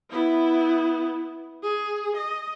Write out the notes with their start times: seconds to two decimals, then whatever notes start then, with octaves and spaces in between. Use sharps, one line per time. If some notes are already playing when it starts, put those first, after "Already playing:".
0.10 B3 E4
1.63 G#4
2.17 D#5